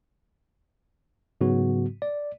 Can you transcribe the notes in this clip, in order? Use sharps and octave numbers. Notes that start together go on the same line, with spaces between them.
G#2 C#3 F#3 B3 F#4
D5